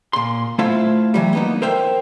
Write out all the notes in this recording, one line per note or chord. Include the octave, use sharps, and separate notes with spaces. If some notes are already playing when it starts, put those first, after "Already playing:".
A#2 C6
A3 E4 F4 C5 E5 F5
E3 F#3 G3
A#3 B3 D#4
A#4 C5 E5 G5